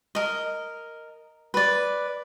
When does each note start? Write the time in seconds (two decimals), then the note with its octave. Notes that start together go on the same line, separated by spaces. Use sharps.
0.15 A#4 D#5
1.54 B4 D5